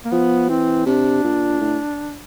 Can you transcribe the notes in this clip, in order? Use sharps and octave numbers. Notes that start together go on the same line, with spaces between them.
A#3
F3 B3
E3 C4
C3 D4
A#2
A2